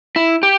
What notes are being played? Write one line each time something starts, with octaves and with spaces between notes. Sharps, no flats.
E4
G4